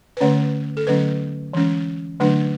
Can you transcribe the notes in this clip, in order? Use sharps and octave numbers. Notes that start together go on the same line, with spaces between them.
B4
D3 A3 C#4 C#5
A4
D3 F#3 A3 C#4 B4
E3 G#3 C#4
D3 F#3 A3 D4 B4